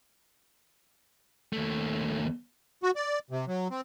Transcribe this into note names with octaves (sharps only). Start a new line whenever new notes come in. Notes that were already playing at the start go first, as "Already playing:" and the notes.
D#2 A3
F#4
D5
C3
F#3
C4